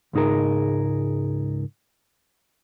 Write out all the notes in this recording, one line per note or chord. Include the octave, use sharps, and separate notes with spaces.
C#2 G#2 D#4 G#4 A#4